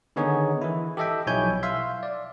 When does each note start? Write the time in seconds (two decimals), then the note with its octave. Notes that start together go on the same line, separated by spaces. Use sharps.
0.16 D3 D#3 B3 D#4 G#4 C#5
0.62 E3 E4
0.97 G4 A4 D#5 E5 G5
1.27 B1 F3 E4 C#5 G#5 G6
1.63 E5 F5 C6
2.03 D5